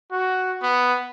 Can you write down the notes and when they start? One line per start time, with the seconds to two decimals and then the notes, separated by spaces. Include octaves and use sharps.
0.12 F#4
0.62 B3